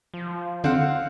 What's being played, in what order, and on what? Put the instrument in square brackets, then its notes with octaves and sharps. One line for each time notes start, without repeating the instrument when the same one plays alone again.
[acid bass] F3
[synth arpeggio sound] D3 [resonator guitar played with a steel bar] C4 F#5 [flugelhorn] F5